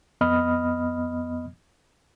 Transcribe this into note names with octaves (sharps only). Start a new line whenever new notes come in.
F2 B3 D#5 B5 D#6 F6